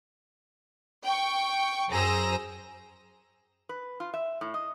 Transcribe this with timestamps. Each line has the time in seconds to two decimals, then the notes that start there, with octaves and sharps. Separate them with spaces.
1.05 G5 C#6
1.89 F#2 G#4 C5 A#5 E6 A#6
3.69 B4
4.00 F4
4.14 E5
4.41 A2
4.54 D#5